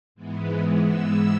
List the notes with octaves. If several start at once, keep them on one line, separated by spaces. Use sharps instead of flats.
G#2 E3 G#3 B3
E6